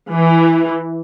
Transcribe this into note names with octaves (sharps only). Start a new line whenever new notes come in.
E3